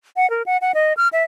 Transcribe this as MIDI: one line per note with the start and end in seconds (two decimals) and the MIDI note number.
0.16 0.29 78
0.30 0.42 70
0.46 0.57 78
0.61 0.72 78
0.74 0.93 75
0.97 1.08 89
1.13 1.23 76